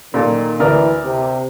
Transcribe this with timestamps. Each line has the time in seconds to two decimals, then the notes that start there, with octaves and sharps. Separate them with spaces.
0.14 A#2 D#3 A4
0.59 D2 E3 A#4 D5
1.05 C3